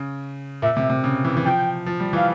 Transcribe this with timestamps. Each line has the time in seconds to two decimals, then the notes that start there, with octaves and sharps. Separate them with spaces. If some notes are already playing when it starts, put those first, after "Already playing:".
Already playing: C#3
0.62 A#2 E5
0.77 C3
0.90 C3
1.04 C#3
1.25 E3
1.37 E3
1.45 F3 G5
1.86 F3
2.00 G3
2.13 E3
2.16 F5